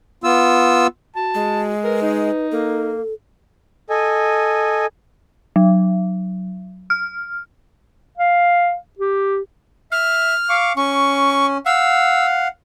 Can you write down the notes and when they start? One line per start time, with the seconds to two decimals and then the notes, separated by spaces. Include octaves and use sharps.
0.24 B3 F4 E6
1.15 F#4 A5
1.34 G#3
1.84 A#4 B4
2.02 D#4
2.52 A#3 A4
3.90 A4 D#5 G#5
5.56 F#3
6.90 F6
8.17 F5
8.99 G4
9.92 E5 F6
10.49 F5 C#6 D6
10.77 C#4 C#6
11.66 F5 F#5 E6